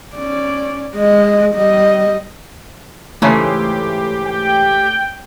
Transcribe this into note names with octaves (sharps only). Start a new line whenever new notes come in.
C#4 D5
G#3 D#5
G3 D#5
G#2 C#3 E3 A3 G4 C#5 C7
G5